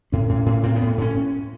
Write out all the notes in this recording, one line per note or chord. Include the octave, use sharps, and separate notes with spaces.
A2 C#4
A2
A2
A2 C4
B3
A2
A2 C#4